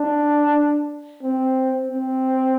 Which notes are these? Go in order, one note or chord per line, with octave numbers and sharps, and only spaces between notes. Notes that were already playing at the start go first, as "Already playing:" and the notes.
Already playing: D4
C4
C4